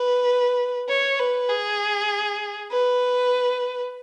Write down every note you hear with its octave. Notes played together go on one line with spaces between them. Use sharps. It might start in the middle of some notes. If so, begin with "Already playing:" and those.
Already playing: B4
C#5
B4
G#4
B4